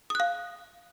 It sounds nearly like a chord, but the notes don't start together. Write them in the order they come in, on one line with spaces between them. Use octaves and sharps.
D#6 F#6 F5